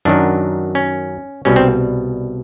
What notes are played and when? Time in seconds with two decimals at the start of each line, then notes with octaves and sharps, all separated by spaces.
0.05 F#2 D#3 F#3 D4
0.75 C#4
1.45 C2 B2 G3 C#4
1.56 C4